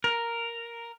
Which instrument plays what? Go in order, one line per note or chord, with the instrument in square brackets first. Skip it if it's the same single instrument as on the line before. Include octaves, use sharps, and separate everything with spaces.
[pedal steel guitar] A#4